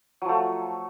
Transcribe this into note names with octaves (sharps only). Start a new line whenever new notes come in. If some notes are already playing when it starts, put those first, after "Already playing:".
F3 F#3 A3